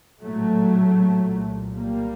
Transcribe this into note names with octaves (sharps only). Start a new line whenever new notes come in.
A#1 A2 F#3 A3
C2 A#2
G3 A#3